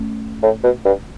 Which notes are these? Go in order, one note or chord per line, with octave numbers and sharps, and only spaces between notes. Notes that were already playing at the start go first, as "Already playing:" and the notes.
Already playing: A3 C#4
A2
B2
G2